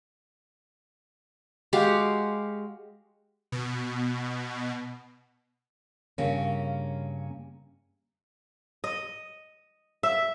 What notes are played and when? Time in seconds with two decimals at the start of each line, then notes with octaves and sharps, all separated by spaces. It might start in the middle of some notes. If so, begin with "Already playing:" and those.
1.73 G#3 F#4 G4 F5
3.52 B2
6.18 G2 C#3 A#3 C#4
8.84 D#5
10.03 E5